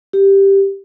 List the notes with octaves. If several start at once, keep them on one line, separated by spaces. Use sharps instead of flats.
G4